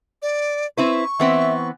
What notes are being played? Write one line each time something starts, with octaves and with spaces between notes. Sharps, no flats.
D5
C4 E4 B4 C#6
E3 B3 C4 E5